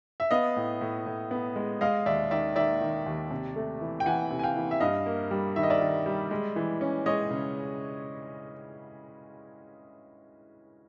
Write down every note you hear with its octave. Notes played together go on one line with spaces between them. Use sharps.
E5
B3 D#5 F5
A2
A2
A2
B3
G#3
G#3 D#5 F5
D#2 D5 E5
D#3 D5 E5
D#3 D5 E5
D#3
D#2
C3
A3
E3
G5
E3 F#5 G#5
C3
G#5
F5 G5
E3
E5
G2 D#5 F5
A#3
G3
D#3 E5
D#5
D5 E5
D#3
G3
G#3
E3
C#4
G#3 C#5 D#5
C#3